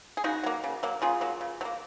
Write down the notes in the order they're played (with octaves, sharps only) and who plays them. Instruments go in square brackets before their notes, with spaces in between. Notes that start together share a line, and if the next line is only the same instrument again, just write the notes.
[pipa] G#4
C#3 D#4 F#4
F#3 A#3
C#3
F#3 A#3
C#3 F4 G#4
F#3 A#3
C#3
F#3
A#3